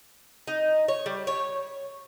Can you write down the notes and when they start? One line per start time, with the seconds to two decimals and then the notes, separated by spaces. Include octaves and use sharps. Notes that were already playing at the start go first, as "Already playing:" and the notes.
0.48 D#4
0.88 C#5
1.06 G3
1.27 C#5